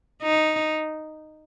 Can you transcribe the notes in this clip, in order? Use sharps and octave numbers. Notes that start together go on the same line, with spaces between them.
D#4